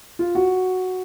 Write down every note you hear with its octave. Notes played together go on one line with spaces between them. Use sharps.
F4
F#4